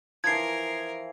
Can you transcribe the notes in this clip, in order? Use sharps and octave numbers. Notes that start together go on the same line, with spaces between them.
E3 F3 A#4 G#6 C7